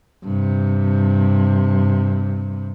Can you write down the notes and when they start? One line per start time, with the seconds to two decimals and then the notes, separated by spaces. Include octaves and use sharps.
0.24 G2 C3